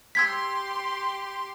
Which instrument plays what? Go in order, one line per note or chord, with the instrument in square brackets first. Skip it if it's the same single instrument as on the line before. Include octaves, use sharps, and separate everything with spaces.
[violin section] G4 C6 [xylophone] E6 G#6 B6